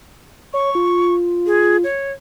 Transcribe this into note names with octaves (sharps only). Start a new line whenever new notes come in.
C#5 C#6
F4
G#4
C#5